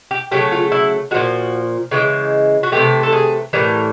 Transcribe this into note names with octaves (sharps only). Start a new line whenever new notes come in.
G4
C#3 F#3 A3 G4
F4
E4
A#2 F3 G#3 F#4
C#3 E3 G#3
F#4
C3 E3 A3 G4
A4
G#4
A2 E3 G3 A#4